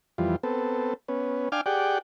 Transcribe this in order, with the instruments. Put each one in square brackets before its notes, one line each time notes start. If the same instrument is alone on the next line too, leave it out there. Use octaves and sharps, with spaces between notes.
[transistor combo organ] F2 E3 G3 F4
B3 C4 A4
B3 C#4
D4 F5 G5 G#5 D6 F6
G4 G#4 D5 F#5 G5